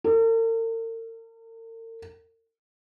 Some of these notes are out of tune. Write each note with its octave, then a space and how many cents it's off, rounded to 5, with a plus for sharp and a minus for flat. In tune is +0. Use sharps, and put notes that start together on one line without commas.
A#4 -45